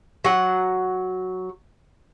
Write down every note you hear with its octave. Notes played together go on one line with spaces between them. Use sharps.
F#3 F#5